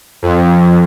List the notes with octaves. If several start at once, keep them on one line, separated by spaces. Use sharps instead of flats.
F2